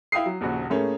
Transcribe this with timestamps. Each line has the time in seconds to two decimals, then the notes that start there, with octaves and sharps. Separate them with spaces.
0.12 E4 F5 G5 D#6 C7
0.26 F#3
0.41 D#1 A#1 C#3 F#4
0.70 A2 A3 A#3 C#4 G#4